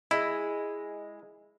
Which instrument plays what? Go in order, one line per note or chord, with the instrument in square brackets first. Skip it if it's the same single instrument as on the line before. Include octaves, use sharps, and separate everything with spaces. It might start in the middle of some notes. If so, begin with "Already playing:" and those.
[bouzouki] G#3 [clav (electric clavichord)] E4